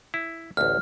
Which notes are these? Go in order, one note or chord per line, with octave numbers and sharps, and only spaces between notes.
E4
A1 D2 F6